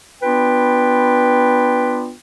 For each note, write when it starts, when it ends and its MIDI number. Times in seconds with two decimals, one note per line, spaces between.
0.22 2.11 59
0.22 2.11 62
0.22 2.11 65
0.22 2.11 71
0.22 2.11 79